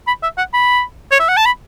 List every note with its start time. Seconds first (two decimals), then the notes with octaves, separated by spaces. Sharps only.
0.07 B5
0.23 E5
0.38 F#5
0.54 B5
1.11 C#5
1.19 E5
1.29 F#5
1.37 A5
1.46 B5